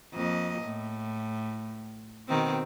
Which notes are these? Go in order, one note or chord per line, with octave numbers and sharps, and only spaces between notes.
F2 A#3 D#5
A2
B2 D#3 C4